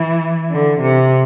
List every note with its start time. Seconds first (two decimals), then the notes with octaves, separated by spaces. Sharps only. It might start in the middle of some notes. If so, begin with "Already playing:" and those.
Already playing: E3
0.51 D3
0.81 C3